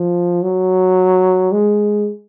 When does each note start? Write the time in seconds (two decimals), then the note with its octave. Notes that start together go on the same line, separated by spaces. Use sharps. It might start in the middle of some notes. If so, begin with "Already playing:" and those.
Already playing: F3
0.43 F#3
1.52 G#3